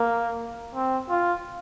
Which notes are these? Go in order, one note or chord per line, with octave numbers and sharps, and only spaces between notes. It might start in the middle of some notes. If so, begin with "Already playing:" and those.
Already playing: A#3
C4
F4